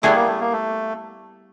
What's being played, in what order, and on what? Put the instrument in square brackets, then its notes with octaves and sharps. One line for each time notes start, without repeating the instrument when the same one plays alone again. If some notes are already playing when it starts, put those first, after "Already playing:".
[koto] G3 B3 E4 G#4 [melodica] A3
[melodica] A#3
A3
A#3
A3